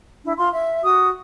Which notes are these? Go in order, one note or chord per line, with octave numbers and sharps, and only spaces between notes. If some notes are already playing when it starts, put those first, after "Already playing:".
D4 E4
F4 F5 C6
E5
F#4 D#6